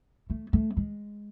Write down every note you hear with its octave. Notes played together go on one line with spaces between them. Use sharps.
A3
A3
G#3